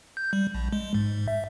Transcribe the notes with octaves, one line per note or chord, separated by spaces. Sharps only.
G6
G3
A#1
G#3
G#2
E5